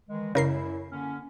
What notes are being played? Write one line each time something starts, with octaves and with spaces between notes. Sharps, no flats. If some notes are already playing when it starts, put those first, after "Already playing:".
D#3 E3 G#3
F#2 C#3 E4 A#4 C7
D3 A#3 C#4